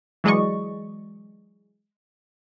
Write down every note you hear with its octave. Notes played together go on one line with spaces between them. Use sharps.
E3 F#3 G#3 D5 D#5 C#6